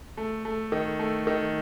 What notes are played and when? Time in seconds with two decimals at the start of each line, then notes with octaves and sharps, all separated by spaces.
0.17 A3
0.45 A3
0.72 D#3
0.99 A3
1.27 D#3